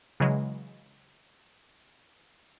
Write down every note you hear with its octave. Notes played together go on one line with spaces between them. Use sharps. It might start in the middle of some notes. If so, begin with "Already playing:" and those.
C#3 E3 F#3 G#3